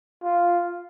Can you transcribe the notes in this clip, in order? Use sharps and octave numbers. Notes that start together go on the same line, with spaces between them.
F4